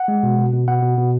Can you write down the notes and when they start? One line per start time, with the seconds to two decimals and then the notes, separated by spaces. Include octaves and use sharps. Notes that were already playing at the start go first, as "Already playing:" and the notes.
Already playing: F#5
0.08 G#3
0.23 B2
0.38 B2
0.53 B2
0.68 B2 F#5
0.83 B2
0.97 B2